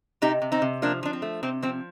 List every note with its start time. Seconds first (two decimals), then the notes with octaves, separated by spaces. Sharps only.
0.22 C3 D#4 G4
0.42 C3
0.52 C4 D#4
0.62 C3
0.82 F3 A#3 D4
1.03 F3 D4
1.13 C4
1.22 A3
1.43 C3 C4
1.62 F3 C4